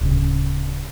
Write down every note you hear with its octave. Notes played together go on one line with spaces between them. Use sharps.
D1 C#3